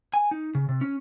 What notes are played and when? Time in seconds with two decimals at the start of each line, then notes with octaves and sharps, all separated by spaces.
0.14 G#5
0.31 D#4
0.55 C#3
0.69 C3
0.81 C#4